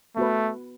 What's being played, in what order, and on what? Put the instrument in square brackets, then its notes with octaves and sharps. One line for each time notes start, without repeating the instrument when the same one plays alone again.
[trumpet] A3 [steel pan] B3 F#4 B4